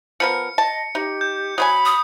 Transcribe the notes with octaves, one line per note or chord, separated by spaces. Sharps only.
F3 B3 A#4 C#7
D#5 A5
D#4 G4
G6
F#3 C5 G#5 B5 D#6
D#6